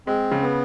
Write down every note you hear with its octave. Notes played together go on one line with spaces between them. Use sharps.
G#3 C4
C#3
B3